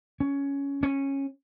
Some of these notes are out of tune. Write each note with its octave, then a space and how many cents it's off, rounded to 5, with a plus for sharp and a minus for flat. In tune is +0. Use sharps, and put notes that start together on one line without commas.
C#4 +10
C#4 -15